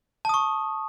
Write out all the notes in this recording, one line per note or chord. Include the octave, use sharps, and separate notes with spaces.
A5 C#6 D#6